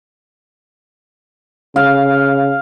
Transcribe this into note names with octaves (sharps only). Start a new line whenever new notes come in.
C#3 F5